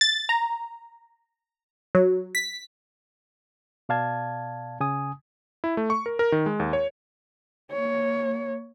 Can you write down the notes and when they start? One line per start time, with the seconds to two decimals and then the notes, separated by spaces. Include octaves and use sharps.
0.01 A6
0.29 A#5
1.95 F#3
2.35 B6
3.89 B2 D5 F5 A5 G#6
4.80 C#3 G#5 D#6
5.64 E4
5.77 A3
5.90 C#6
6.06 A#4
6.19 A#4
6.32 D#3
6.46 G#3
6.60 D#2
6.73 C#5
7.72 A#3 C#5